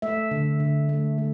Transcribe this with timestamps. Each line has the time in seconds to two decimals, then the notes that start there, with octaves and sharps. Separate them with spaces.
0.02 A3 E5
0.31 D3
0.60 D3
0.89 A3
1.18 A3